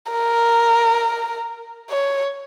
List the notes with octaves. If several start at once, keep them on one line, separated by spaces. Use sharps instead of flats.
A#4
C#5